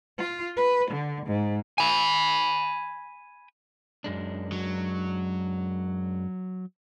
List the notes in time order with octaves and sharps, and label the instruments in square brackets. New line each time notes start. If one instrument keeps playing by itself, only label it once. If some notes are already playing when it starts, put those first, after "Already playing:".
[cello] F4
B4
D3
G#2
[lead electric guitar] G#5 B5
[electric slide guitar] F#2 G#3 D4
[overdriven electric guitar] F#3